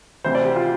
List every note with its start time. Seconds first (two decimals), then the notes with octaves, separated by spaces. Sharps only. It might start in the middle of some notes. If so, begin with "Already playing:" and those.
0.24 D2 C3 E3 C5
0.35 D5
0.46 G4
0.56 F4